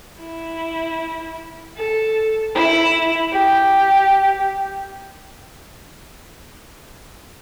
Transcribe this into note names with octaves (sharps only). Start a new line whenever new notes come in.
E4
A4
E4
G4